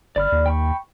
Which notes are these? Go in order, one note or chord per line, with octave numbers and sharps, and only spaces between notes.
G1 D5 B5 F6
D#2
G5 B5 C#6